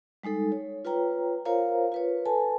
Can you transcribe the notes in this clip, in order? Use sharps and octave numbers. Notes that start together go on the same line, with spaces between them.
G3 G#3 D#4 A4
C#5
F4 B4 C#5 G5 A#5
F4 A#4 C5 C#5 F5 A#5
F4 B4 C#5
A4 B4 G#5 A5